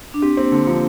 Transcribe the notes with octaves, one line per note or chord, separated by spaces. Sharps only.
D4
C4 G4
A#3 C4
D3 A#3
F3 A#3